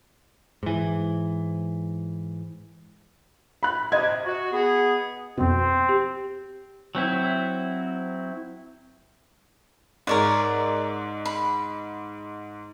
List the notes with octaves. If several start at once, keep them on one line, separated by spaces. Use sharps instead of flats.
G#2 E3
B5 F#6
C3 D#5 G#6
F#4
B3 G#4
F2 B2 C4
G4
F#3 C4 E4
G#2 A#4 C#5 D5
B5